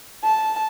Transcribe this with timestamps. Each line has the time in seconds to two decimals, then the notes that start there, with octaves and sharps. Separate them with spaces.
0.24 A5